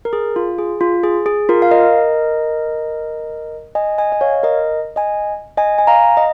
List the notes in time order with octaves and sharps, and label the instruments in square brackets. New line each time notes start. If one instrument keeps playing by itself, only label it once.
[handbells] A#4
G#4
F4
G#4
F4
G#4
G#4
F4 A#4
F5
A#4 D#5
D#5 G#5
D#5 G#5
D#5
C#5 F5
A#4 D#5
D#5 G#5
D#5 G#5
G#5
F5 A#5
D#5